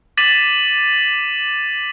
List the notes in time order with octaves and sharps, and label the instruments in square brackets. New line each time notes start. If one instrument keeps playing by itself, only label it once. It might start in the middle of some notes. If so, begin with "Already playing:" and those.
[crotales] D6 A6 B6 D#7 E7 F#7